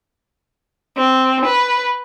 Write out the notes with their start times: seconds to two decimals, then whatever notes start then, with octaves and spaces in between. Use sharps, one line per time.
0.97 C4
1.45 B4